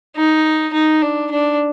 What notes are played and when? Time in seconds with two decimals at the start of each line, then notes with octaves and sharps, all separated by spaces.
0.16 D#4
0.73 D#4
1.02 D4
1.31 D4